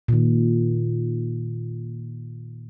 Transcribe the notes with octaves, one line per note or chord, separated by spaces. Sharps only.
A#2 D#3